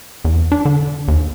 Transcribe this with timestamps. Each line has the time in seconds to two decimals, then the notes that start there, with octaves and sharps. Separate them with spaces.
0.25 E2
0.52 D4
0.65 D3
1.08 D#2